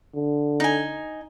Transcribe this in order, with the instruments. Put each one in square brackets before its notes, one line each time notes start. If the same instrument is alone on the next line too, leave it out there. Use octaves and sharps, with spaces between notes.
[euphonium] D3
[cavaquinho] D#4 G#5